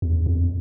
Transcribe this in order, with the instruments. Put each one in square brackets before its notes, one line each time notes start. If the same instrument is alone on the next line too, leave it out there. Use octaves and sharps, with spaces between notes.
[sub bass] E2
F2